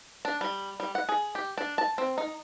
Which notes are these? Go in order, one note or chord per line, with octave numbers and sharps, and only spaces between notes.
D4
G3
G3
F#5
G#4
G4
D4
A5
C4
D#4